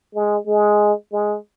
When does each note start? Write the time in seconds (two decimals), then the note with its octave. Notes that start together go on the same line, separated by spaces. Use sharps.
0.15 G#3
0.47 G#3
1.12 G#3